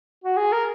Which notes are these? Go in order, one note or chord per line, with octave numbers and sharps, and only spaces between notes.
F#4
G#4
A#4